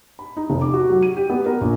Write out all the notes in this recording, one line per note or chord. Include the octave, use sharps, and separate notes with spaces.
B5
D#4
F1
D6
F#4
F#3
D#7
G4
B3
A#4
A#1